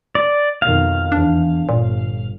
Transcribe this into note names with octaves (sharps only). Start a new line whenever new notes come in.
D5
F2 B2 D#3 F5
E2 D4
G1 A#2